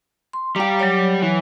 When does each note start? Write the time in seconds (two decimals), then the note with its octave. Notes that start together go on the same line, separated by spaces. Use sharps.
0.33 C6
0.56 G3 G4 F5 A#5
0.79 F#3 C#5
1.22 E3